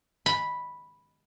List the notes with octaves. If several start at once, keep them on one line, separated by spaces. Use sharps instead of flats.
B5